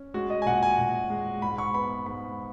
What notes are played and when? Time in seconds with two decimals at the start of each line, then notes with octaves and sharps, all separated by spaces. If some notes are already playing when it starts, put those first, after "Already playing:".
Already playing: C#4
0.14 G#3 F#4
0.30 D#5
0.42 G#5
0.46 A#2 F#5
0.63 G#5
0.78 A#2
1.10 G#3
1.42 G#2 B5
1.58 C#6
1.74 B3 B5
2.06 G#2 B5